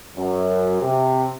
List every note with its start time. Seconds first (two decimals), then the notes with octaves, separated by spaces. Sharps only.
0.17 F#2
0.81 C3